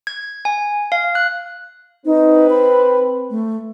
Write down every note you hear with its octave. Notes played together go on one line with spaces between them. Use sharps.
G#6
G#5
F5
F#6
C4 D#4 B4
B5
A3